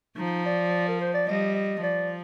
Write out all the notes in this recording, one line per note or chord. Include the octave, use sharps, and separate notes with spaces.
F3 D#4
D5
A#4
C5
D5
G3 D#5
D#5
F3 D5